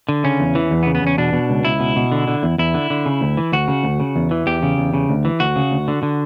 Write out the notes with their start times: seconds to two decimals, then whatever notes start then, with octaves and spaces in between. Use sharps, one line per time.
0.09 D3
0.24 C#3 C#4
0.40 E2
0.55 E3
0.71 E2
0.83 B3
0.86 C#3
0.95 B3
1.02 E2 C#4
1.18 B2 D4
1.33 B2
1.50 C#2
1.65 C#2 E4
1.80 B2
1.96 B2
2.12 D3
2.28 D3
2.43 E2
2.58 E2 E4
2.74 D3
2.90 D3
3.06 C#3
3.21 D2
3.37 E3
3.52 D2 F#4
3.68 C#3
3.84 D2
4.00 C#3
4.16 E2
4.31 E3
4.47 E2 G4
4.63 C#3
4.78 E2
4.94 C#3
5.09 D2
5.25 E3
5.40 D2 F#4
5.56 C#3
5.71 D2
5.88 D3
6.03 D3